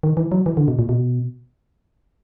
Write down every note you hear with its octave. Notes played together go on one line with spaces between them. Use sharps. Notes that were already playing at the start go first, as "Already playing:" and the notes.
D#3
E3
F#3
E3
D3
B2
A#2
B2